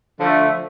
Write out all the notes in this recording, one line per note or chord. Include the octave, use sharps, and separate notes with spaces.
D3 F3 A3